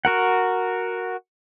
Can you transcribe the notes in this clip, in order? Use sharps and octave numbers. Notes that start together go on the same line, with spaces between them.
F#4 A#4 F#5